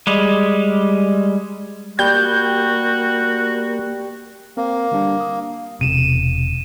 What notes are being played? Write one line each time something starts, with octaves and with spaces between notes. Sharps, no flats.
G3 G#3
G3 A#3 F#4 G6
A#3 C4 A#4
D3 G3 D4
D#6
E1 C3 D#7 E7